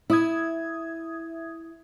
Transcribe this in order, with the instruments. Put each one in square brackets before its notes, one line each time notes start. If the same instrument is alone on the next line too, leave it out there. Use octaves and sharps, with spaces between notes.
[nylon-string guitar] E4 [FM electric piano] E5 D#6 G#6